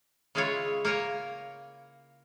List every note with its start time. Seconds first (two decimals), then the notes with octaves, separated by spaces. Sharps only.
0.35 C#3 G#3 E4 F4 G#4 C#5
0.85 A#3 A#4 C#5 G#5